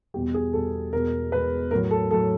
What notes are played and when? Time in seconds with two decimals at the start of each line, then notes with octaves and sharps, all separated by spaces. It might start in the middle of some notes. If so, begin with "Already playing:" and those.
0.14 E2 B2 G3 G4
0.34 G#4
0.53 E2 B2 G3 A4
0.93 E2 B2 G#3 A#4
1.32 E2 B2 G#3 B4
1.71 A2 F#3 A#4
1.91 A4
2.11 A2 F#3 A4